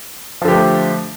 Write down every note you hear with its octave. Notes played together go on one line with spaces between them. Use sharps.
D3 F3 A3 G4